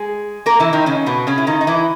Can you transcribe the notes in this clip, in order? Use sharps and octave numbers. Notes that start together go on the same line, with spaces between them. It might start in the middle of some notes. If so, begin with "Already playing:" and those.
Already playing: G#3 G#4
A#3 A#4
E3 E4
D#3 D#4
C#3 C#4
B2 B3
C#3 C#4
E4
D#3 D#4
D#4
E3 E4